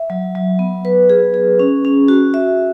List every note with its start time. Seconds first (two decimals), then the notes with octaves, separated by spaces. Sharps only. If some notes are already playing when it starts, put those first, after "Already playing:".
Already playing: E5
0.10 F#3
0.35 F#3
0.59 B3
0.85 B4
1.10 G#4
1.34 G#4
1.59 C#4
1.85 C#4
2.08 F#4
2.34 E5